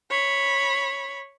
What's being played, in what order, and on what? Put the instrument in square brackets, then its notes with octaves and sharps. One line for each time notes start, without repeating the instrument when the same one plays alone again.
[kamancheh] C#5 B5